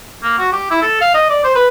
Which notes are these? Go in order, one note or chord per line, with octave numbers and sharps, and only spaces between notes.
A#3
F#4
G4
E4
A4
F5
D#5
D5
C5
B4